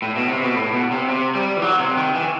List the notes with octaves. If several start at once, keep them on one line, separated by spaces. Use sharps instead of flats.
A2
B2
C3
B2
A2
B2
C3
C3
G3
E3
F#3
C3
D#3
E3